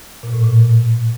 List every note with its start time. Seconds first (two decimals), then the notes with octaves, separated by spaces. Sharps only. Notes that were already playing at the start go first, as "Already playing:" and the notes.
0.23 A#2
0.34 A2
0.44 A#2